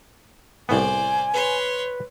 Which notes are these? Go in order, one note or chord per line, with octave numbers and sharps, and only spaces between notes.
C2 A2 B3 C5 D5 G#5
B4 C#5 C6